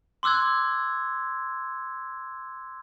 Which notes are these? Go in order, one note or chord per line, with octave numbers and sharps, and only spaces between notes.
C6 D6 E6 F#6 G#6